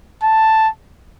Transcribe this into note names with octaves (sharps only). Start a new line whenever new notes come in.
A5